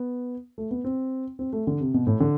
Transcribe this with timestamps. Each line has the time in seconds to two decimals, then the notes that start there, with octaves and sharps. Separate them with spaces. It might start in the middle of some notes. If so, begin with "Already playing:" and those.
Already playing: B3
0.58 A3
0.71 B3
0.84 C4
1.39 C4
1.53 A3
1.67 D3
1.80 C3
1.94 B2
2.07 A2
2.20 D3